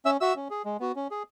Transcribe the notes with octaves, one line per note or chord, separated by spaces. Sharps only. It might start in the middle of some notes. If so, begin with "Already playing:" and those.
C#4 E5 E6
F#4 E5 E6
C#4
G#4
G#3
B3 F#4
C#4
G#4